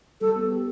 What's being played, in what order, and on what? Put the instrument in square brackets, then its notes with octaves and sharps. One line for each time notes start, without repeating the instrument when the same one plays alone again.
[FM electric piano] G3 [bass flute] A4
[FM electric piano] B3
G4